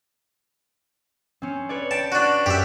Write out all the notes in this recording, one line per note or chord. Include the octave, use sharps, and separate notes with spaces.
C4 C#4
B4 C#5 D5
G5 A5 B6 D7
D4 F#4
F#2 G4 E5